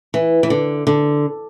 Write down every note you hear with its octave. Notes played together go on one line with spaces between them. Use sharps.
E3
E3
D3
D3